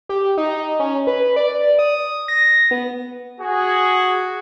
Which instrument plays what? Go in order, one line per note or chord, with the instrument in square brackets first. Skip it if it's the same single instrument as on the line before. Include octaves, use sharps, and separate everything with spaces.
[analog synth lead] G4
D#4
C#4
B4
D5
D#6
A#6
B3
[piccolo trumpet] F#4 [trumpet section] G#4